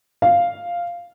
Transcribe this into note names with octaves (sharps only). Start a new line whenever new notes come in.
F5